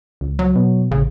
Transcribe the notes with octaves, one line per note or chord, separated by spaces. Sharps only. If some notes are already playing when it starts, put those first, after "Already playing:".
C#2
F#3
B2
A1 C#3